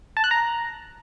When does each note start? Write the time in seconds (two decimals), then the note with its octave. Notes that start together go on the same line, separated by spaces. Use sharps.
0.17 A5
0.24 F#6
0.31 A#5